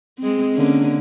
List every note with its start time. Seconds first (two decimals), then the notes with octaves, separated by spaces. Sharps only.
0.19 G#3 C4
0.55 D3 A#3 C#4